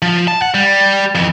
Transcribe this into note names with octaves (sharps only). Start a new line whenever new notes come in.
F3
A5
F#5
G3
F2 E3